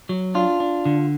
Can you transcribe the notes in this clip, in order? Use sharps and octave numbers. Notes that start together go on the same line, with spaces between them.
F#3
D4 F4
D4
D3